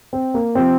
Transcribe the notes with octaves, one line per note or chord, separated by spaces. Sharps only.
C4
A#3
C3 F3 C4